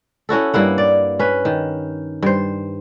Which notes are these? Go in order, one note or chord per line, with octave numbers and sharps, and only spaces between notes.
C#4 E4 F#4 A4
G2 A#3 E4 F#5
D5
C#4 B4
D#3
G2 C5